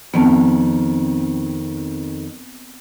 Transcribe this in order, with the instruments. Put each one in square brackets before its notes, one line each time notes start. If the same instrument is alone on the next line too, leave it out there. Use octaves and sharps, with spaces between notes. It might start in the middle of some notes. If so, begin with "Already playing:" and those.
[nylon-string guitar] F2 D#3 [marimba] B3 C4 A5